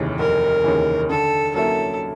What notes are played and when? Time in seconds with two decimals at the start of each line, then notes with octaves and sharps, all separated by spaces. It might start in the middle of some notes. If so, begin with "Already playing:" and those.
Already playing: F1 D#2 C#3 E3
0.19 F1 A#4
0.64 D#2 C#3 E3
1.09 D3 A4
1.54 F#3 A#3 C#4 E4 A4